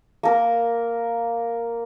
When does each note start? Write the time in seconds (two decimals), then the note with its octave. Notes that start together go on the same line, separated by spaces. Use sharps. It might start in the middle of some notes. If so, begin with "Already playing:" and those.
0.23 A#3 A#4